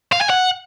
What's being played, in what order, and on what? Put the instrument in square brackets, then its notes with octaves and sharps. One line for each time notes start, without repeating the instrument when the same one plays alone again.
[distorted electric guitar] F5
G#5
F#5